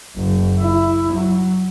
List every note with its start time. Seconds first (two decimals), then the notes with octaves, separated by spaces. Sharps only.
0.16 F#1
0.60 E4
1.13 F#3